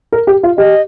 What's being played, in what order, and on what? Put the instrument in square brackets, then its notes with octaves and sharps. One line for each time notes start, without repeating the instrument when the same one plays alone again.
[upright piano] A#4
G4
F4
[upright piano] G4 [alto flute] D#5